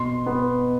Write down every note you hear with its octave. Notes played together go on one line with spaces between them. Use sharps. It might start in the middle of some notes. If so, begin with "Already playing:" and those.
Already playing: B2 C6
B3